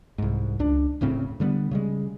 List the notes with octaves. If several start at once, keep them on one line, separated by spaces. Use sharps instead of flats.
C2 G#2
C#2 D4
D1 A2 C#3 C4
D3 G3 G#3 B3
C#3 G3 G#3